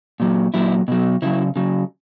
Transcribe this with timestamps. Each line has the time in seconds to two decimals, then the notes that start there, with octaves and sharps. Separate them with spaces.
0.20 A#2 F#3
0.54 A#2 F#3 E4
0.88 B2 F#3
1.22 C#3 F#3 E4
1.56 C#3 F#3